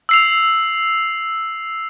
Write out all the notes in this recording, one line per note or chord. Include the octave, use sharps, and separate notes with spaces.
E6 C7 F7